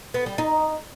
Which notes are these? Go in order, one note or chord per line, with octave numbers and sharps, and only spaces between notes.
B3
G3
D#4